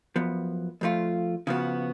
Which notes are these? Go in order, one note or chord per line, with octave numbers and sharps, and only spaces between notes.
F#2 F3 B3
F2 F3 A3 F4
C#3 F3 B3 F#4